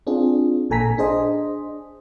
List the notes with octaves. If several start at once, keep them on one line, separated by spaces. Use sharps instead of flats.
C4 D4 F4 G#4
A1 A#2 A4 G#5 A#5 B6
D4 G#4 C5 D#5